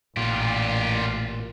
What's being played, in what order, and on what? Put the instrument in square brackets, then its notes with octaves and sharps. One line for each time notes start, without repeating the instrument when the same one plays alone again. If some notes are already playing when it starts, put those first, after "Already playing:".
[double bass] A1 [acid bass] A#2 [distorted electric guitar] F4 G4